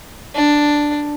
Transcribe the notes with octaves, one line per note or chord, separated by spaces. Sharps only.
D4